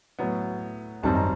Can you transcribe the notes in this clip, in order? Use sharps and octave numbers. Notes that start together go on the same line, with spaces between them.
A2 F#3 B3
G#1 F#2 D#3 G3 C4 A5
A#5